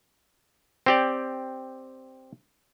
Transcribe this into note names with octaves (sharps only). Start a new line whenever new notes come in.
C4 G4 D5